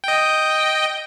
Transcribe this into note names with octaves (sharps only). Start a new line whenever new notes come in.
D#5 G5